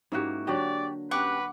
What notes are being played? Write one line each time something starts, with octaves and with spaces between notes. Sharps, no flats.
G#2 A#3 C#4 E4 F#4 G4
D3 F#3 F#4 G4 D5
C#4 G4 B4 F#5 G5 C#6 D6